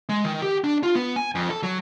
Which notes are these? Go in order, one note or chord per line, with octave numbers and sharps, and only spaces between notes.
G#3
D#3
G4
D4
F4
B3
G#5
F2
A4
F#3